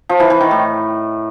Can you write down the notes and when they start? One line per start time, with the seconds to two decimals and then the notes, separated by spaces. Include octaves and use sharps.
0.09 F3
0.20 E3
0.30 E3
0.41 D#3
0.51 A2